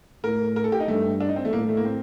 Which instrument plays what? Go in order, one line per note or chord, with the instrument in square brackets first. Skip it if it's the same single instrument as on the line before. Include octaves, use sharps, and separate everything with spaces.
[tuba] A2 [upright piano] A#4
[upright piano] A#4
A4
G4
D#4
[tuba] G2 [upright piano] A3
[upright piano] D4
D#4
C4
A3
[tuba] A2 [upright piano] A#3
[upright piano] A3
A#3
C4